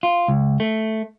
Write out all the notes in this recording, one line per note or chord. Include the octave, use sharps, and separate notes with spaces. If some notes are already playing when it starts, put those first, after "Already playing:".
F4
C#2
A3